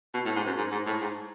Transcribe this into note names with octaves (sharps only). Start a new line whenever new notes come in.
B2
A2
G#2
F#2
G#2
G#2
A2
G#2